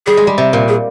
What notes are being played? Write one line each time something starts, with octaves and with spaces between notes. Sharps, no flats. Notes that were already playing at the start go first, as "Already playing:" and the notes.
G3 G#4
G#3
G3
C3
A#2
G#4